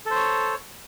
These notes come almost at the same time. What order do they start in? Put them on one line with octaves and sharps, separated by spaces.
A4 C5 C#5